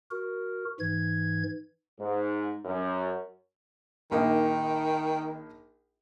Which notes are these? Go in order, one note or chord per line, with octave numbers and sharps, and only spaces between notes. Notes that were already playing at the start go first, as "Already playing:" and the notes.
F#4 A#4
G#2 E3 G#6
G#2
F#2
A#1 D#3 A#3 D#4